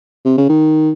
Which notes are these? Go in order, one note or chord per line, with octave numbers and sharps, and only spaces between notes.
C3
C#3
D#3